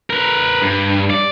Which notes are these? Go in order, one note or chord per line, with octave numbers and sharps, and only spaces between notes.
A#4 B4
G2
D5